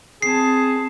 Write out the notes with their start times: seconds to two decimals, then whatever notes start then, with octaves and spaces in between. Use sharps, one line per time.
0.22 C4 G#4 A5 C7